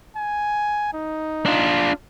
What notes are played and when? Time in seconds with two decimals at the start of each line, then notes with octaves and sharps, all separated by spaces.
0.17 G#5
0.94 D#4
1.46 D4 F4